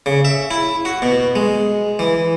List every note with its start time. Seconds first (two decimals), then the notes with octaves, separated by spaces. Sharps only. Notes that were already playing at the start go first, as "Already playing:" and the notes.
0.06 C#3
0.25 E5
0.51 E4
0.85 F#4
1.02 B2
1.36 G#3
1.99 E3